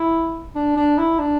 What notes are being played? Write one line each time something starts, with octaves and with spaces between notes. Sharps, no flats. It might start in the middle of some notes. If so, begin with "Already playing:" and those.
Already playing: E4
D4
D4
E4
D4